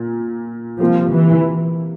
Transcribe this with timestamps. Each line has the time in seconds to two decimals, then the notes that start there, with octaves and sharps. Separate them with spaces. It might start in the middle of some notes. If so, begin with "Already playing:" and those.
Already playing: A#2 A#3
0.80 C3 F3 G3 A#3 F4
1.12 E3